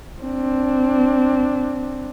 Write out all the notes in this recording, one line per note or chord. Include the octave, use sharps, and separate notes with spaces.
C4 D4